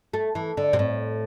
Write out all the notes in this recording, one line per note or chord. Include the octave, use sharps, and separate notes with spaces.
A3
E3
D3
C3
A2